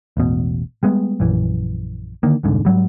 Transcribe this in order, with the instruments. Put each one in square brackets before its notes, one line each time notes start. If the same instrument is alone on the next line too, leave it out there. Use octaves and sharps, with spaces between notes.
[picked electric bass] E1 A1 B2
G3 G#3 B3
A#1 F#2 E3
D3 D#3 A#3
E1 C2 G#2 D3
G#2 F#3 G3